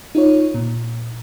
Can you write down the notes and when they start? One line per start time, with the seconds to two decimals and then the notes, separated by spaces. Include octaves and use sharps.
0.15 D#4 F4 C#5
0.54 A#2